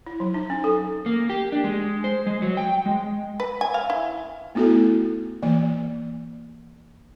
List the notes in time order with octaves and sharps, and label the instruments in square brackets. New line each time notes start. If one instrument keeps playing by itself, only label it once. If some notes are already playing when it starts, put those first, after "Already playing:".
[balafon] E4
F#3
D#4
C#4
A4
[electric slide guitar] A#3
G4
D4
G#3
C5
G#3
F#3
G5
G#3
[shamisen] B4
G#5
F5
E4
[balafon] A3 B3 E4 F#4 A4
E3 A#3 D5